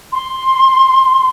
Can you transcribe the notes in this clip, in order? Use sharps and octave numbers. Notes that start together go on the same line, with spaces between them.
C6